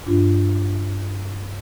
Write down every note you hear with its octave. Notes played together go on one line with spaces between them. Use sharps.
G2 D4 F4